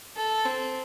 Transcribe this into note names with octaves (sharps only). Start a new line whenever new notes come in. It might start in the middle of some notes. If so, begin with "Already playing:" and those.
A4
C4